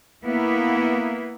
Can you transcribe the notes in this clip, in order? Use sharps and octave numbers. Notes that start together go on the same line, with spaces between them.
A#3 B3 E4